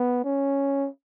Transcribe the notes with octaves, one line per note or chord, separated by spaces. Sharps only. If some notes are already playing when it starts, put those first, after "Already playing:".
Already playing: B3
C#4